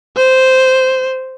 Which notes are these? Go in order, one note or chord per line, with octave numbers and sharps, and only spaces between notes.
C5